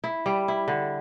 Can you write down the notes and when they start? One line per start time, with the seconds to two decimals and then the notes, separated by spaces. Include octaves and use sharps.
0.04 E4
0.26 G3
0.48 E4
0.68 D3